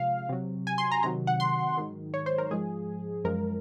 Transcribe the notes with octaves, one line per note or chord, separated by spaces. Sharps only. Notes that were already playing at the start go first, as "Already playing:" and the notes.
Already playing: C3 F3 G#3 F5
C3 F#3
G#5
C6
A#5
C3 D#3 F#3 A#5
F#5
C6
G#2 D#3 F#3
C#5
C5
A#4
G#2 F3 G#3 G#4
F#2 F3 G#3 A#4